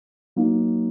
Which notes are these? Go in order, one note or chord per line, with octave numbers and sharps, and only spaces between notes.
F#3 A#3 D#4